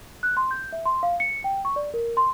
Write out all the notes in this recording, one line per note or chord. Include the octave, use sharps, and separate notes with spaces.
F#6
C6
G6
E5
C6
F5
C#7
G5
C#6
D5
A#4
C6